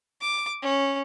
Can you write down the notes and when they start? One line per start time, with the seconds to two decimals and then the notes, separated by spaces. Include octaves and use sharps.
0.21 D6
0.62 C#4